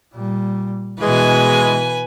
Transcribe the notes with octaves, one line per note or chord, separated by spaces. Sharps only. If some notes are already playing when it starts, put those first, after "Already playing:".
A#2 G3
B2 E3 G#3 B4 G#5